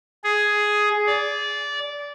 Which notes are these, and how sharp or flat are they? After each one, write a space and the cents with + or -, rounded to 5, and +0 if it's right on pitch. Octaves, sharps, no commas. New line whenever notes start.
G#4 +5
D5 -20